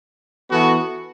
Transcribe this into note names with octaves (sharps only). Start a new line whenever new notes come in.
E3 B3 F#4 A4